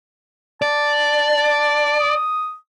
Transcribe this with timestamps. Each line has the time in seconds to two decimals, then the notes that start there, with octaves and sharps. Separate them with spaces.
0.62 D5 A5
2.00 D#6